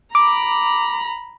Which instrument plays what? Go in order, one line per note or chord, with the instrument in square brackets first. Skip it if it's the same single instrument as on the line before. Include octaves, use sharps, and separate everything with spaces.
[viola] A#5 B5 [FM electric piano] D6